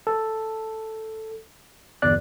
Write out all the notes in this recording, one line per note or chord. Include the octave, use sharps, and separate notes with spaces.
A4
G1 E2 D5 F#6